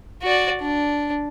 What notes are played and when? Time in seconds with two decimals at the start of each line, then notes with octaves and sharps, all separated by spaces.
0.23 F#4 D5
0.61 D4